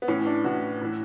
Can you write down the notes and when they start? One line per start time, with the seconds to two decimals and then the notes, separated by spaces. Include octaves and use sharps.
0.02 B3
0.08 A2 E3 C#4
0.26 D4
0.44 A2 E3 F#4
0.81 A2 E3